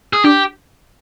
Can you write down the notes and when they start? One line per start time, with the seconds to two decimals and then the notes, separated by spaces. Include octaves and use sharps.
0.13 G#4
0.24 D4 G4